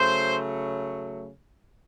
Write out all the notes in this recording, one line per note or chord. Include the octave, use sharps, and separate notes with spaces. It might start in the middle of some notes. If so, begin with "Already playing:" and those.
Already playing: C#3 F#3 A3 C5